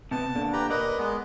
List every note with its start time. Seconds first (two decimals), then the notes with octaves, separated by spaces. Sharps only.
0.11 C3 B3 A5
0.35 A#2 D3
0.53 G4 B4 A#5
0.70 A#4 B4 D5 D#5
0.98 G#3 B3